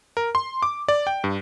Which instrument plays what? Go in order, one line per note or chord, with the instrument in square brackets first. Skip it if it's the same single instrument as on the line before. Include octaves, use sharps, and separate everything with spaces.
[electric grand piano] A#4
C6
D6
D5
G5
G2